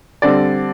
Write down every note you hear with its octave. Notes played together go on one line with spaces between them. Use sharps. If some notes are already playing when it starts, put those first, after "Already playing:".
D3 G3 C4 D5